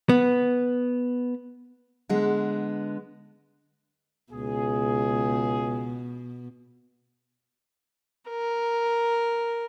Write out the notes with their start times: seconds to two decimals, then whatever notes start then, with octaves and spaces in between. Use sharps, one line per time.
0.09 B3
2.09 D3 G#3 B3
4.33 C#2 B2 G#4
8.30 A#4